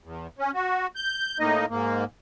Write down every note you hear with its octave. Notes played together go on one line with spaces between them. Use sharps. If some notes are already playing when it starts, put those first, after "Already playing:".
E2
C#4
F#4
G6
A2 A#3 D#4 D#5
G#2 A#3